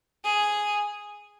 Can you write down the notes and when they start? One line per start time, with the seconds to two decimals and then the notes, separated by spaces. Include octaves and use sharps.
0.24 G#4